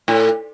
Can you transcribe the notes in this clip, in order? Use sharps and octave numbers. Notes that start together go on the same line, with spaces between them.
A2